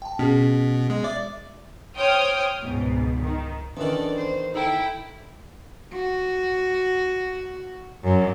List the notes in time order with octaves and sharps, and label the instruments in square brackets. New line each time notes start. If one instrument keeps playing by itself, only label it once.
[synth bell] G5 A5
[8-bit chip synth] B2 [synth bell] C#4 G#4
[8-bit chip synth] G#3
[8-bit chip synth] D5 [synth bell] E5
[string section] C5 C#5 G5 D#6 F6
C#2 G#2 B2
D#3
[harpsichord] E2 D#3 [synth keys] C#4 D4 [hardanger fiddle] A4 D5
[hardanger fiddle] C5
[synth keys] D#4 A4 [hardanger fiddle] E4 G5
[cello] F#4
F#2